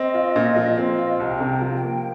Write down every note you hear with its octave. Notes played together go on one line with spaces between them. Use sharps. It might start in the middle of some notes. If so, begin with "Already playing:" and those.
Already playing: C4 D#5
F4
A#2
F3
C4
F4
C2 G5
C3
F3
A#3